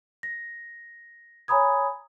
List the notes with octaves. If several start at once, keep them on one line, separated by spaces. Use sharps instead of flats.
A#6
C#5 G#5 A#5 B5 D#6 G#6